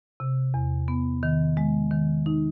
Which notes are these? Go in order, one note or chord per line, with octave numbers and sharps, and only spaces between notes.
C3
E2
B3
D#3
G#3
D#3
D#4